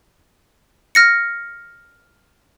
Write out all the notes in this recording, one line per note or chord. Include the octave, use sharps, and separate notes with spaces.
F6 A#6 C#7